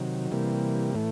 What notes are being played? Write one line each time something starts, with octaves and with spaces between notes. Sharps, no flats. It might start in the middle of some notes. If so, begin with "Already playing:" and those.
Already playing: C3 D#3 F#3
C3 E3 G3 A#3
A2 E3 A3